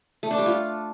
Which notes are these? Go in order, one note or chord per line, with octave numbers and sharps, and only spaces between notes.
A3
D4
G3
F4